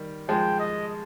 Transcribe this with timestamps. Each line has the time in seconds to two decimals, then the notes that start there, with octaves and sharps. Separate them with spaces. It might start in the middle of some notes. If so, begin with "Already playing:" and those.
Already playing: D#3 G3
0.29 F3 G#3 G5
0.59 D#5